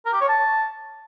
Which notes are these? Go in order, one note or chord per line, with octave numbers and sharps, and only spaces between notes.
A#4
G4
C#5
A5